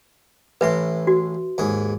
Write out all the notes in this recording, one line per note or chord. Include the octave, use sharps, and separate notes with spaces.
A1 A2 B4 E5 C6
F#4
D#2 G#2 G#4